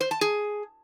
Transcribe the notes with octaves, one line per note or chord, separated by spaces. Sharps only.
C5
A5
G#4